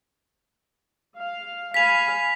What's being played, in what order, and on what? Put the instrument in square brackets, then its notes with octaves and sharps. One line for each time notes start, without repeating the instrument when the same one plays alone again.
[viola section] F5
[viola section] F5 G#5 B5 [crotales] B6 F7